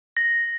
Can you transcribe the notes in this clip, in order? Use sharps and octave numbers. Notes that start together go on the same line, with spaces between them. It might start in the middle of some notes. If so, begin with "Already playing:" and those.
A#6